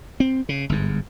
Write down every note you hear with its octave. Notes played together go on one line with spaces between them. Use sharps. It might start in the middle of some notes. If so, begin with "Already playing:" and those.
C4
C#3
G1 G#2